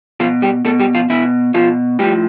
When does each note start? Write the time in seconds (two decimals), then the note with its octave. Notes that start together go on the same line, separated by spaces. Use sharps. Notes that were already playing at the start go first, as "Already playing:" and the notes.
0.20 B2 F3 F4
0.42 G3 G4
0.65 B2 A3 A4
0.80 G3 G4
0.95 F3 F4
1.10 B2 E3 E4
1.54 B2 F3 F4
1.99 A2 F3 G3 G4